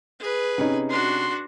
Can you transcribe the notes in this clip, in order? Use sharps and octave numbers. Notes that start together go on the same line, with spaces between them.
G#4 B4
C3 C#4 D#4
D4 F#4 C6